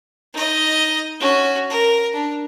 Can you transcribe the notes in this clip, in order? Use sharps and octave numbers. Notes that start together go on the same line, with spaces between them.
D#4 D#5
C#4 F#4
A#4
D4